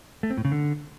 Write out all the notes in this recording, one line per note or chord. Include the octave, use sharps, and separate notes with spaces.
A3
C4
A2
C#3
D3